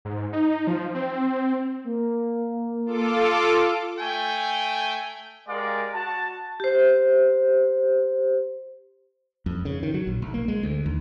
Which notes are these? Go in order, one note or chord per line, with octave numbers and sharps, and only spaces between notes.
G#2
D#4
F3
C4
A#3
F4 A4 D6
A3 G5 G#5
G#3 G4 A#4 D5 F5 G#5
F#4 A5
G4 C5
F2
C#3
D#3
F#3
A#1
B1
A#3
G#3
D2
D#2